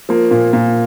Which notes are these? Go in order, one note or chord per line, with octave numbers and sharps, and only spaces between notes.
F3 A#3
A#2
A#2